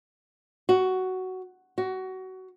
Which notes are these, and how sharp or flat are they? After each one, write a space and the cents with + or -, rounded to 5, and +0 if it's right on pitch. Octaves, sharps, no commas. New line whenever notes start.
F#4 +10
F#4 +20